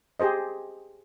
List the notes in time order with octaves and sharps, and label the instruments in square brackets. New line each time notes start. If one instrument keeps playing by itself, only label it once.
[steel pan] G4 G#4 C5 D#5